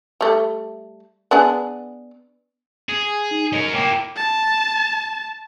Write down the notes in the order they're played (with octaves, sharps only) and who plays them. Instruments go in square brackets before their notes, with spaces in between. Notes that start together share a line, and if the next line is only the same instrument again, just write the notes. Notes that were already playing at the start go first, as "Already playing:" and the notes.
[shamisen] G3 A3
B3 D4 G#4
[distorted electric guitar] G#4
[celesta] D#4
[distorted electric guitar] C#4 A#4 [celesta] D#5
[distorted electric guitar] A#3 E4 [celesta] G5 D6
[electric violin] A5